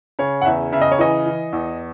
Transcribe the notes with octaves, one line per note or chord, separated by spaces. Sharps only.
C#3 C#5
F#5
E2 E5
C#3 E5
D#5
C#5
E3 D#5
E3
E2